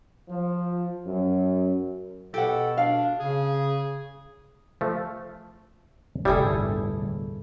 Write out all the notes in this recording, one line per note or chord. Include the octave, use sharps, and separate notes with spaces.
F3
F#2
B2 G4 A4 F#5
D4 F5
C#3 G#4
F3 A3
G1 D#2 A2 C3 G3 E4 G#4 A4